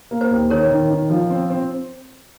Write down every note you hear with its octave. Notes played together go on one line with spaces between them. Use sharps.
A#3
C5
D#2
D#3 A#4 C#5
D#3
D#3
F3
C4
C4